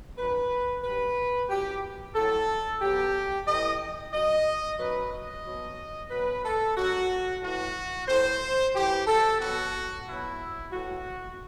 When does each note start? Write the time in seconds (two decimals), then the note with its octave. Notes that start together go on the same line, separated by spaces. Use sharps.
0.18 F#2 D#3 F#3 B4
0.84 G2 F#3 B4
1.49 F#2 E3 G4
2.15 A2 F#3 A4
2.81 B2 F#3 G4
3.47 A2 E3 D#5
4.13 F#2 F#3 D#5
4.79 F#2 D#3 F#3 B4
5.13 D#5
5.45 B2 F#3
6.11 B2 F#3 B4
6.44 A4
6.76 F#2 F#3 F#4
7.42 A2 E3 F#4
8.08 A2 E3 C5
8.74 A2 E3 G4
9.07 A4
9.40 B2 F#3 F#4
10.06 B2 F#3 E4
10.72 A2 E3 F#4